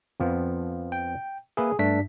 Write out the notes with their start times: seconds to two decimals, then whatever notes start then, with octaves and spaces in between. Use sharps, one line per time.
0.20 F2 F3 B3
0.92 G5
1.57 A#3 G#4 B4 E5
1.79 G2 A3 D4 B6